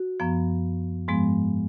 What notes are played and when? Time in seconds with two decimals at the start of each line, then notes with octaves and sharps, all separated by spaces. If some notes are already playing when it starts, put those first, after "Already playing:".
Already playing: F#4
0.20 F#2 F3 B3
1.08 G#2 F3 G#3 B3